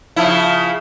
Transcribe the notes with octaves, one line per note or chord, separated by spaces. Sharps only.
C#3 F3 E4